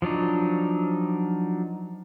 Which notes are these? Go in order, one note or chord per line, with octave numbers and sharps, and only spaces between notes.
F3 F#3 D4 D#4